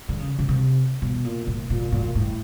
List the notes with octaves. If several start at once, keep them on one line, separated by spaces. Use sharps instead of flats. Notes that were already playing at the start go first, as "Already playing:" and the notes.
D3
C#3
C#3
C3
B2
A#2
A#2
A#2
A#2
A2